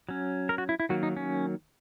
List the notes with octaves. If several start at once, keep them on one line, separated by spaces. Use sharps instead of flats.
F#3 C#4
A#4
F#4
E4
E4
D#3 F#3 A#3 F#4
D#4
C#4